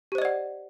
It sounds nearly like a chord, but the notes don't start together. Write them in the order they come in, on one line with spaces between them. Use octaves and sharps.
G4 C5 D#5 D5 F#5